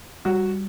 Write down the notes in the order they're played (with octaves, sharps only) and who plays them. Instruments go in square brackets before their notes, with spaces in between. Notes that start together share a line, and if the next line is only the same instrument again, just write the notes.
[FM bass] G3 [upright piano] F#4